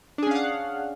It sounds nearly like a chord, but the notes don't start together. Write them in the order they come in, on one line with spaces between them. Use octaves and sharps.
D4 G#4 C#4 F5 F#5